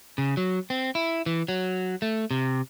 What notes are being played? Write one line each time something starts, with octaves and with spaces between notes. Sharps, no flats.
C#3
F#3
C4
E4
E3
F#3
A3
C3